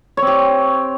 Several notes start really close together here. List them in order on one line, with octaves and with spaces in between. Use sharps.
C#5 C4 G4